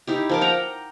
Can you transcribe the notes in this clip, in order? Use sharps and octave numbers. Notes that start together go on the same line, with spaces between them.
D#4 E4 G4
F3 A#4 D6
F#5 G5 A#5